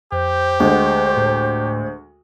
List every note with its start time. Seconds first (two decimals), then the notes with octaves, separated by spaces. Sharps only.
0.12 F2 G4 C5
0.60 D2 G#3 F#5
1.17 A2